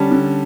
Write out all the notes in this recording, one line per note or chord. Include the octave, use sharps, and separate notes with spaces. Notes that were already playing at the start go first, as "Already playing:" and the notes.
Already playing: D3 G3 C#4 A5
D3